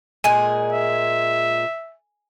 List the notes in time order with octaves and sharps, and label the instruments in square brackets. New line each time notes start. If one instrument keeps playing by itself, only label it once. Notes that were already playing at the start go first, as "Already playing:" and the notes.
[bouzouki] A#2 G#3 G#4 [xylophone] G#5
[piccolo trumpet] E5